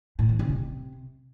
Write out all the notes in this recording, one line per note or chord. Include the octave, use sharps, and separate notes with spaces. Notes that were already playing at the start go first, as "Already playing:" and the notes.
A2
D#3
C#3
C3